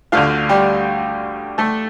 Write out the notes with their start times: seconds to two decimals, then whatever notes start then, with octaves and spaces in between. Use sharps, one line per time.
0.12 D2 D3 A3 F4 F5
0.49 G3 G4
1.58 A3 A4